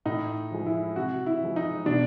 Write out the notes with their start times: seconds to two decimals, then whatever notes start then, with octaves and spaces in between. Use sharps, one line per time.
0.05 A2 D#4
0.51 F3 G#3
0.66 E4
0.96 C3 F#4
1.26 E4
1.41 F3 G#3
1.56 D#4
1.86 B2 D4